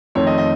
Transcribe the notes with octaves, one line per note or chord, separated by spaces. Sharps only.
F2 D#3 A3 C4 C#5
D#5
D#5